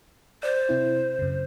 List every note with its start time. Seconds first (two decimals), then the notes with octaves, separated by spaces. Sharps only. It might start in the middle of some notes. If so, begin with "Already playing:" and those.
0.43 C5 D5 A6
0.69 C3 C4 E4
1.19 F#2 C#3